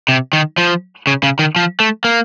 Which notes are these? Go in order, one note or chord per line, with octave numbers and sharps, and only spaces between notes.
C3
D#3
F3
C#3
C#3
D#3
F3
A3
A#3